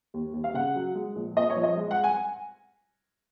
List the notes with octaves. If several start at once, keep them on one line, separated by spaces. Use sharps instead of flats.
D#2
D#2
F5
C#3 F#5
F#3
G#3
A#1
A#2 D#5
C#5
F3
D#5
G#3
F#5
G#5